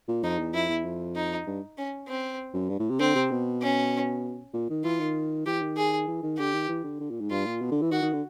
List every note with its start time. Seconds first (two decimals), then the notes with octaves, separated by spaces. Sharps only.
0.08 A#2
0.23 F2 D#4
0.39 E2
0.54 F2 E4
0.69 E2
0.85 F2
1.16 D#4
1.46 G2
1.77 C#4
2.08 C4
2.54 F#2
2.69 G2
2.80 A2
2.90 C3
3.00 D3 C4
3.15 C3
3.31 B2
3.62 C#4
4.53 A#2
4.70 D#3
4.84 E3 F4
5.00 D#3
5.46 E3 G4
5.61 D#3
5.77 G#4
6.08 E3
6.23 D#3
6.38 D3 G4
6.53 D#3
6.69 E3
6.84 D3
7.00 D3
7.10 A#2
7.21 G#2
7.30 G2 F4
7.46 A#2
7.61 B2
7.71 D3
7.82 E3
7.92 D#3 F#4
8.02 D#3
8.13 D3